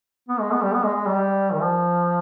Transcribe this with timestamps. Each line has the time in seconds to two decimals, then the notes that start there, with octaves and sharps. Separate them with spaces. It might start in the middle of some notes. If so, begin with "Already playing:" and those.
0.29 B3
0.40 G#3
0.51 B3
0.62 G3
0.74 B3
0.84 G#3
0.95 G#3
1.06 G3
1.52 D#3
1.62 F3